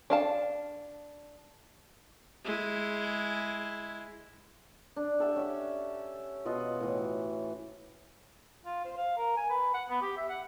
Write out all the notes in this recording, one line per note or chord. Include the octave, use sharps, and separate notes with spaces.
D4 F5 A5
G#3 E4
D4
G4 A4 E5 F#5
C#4 E5
B2 F4 D#5 F#5
A2 E3
F4
C5
F5
A#4
G#5
B4
F#5
B3
G4
E5
F#5